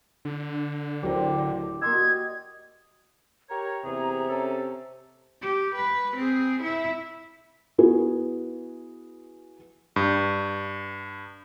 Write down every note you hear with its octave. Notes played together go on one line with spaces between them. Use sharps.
D3
D1 G4 A#4 C5 D5 C6
A#3 D#5 C6 E6 G#6
F#4
G4 A#4 C#5 A#5
E2 C3 G#4
C#4 A4
G4
B4
C4 G#4
E4 E5
B3 E4 F#4 G#4 B4
G2